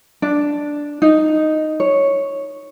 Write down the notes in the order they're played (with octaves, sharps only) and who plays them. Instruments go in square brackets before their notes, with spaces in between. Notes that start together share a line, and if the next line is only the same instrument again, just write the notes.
[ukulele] D4
D#4
C#5